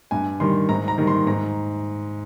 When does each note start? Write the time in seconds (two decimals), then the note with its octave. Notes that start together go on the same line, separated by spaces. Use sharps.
0.11 G2 G#5
0.40 D#3 G3 C6
0.69 G#2 A#5
0.88 A#5
0.98 D#3 G3
1.07 C6
1.27 G#2 A#5